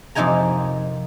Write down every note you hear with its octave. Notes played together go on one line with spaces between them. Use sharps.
F2 C3 A#3 D#4 G#5 A#5